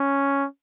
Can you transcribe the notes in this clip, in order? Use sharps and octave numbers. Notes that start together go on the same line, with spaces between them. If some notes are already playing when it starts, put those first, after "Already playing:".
Already playing: C#4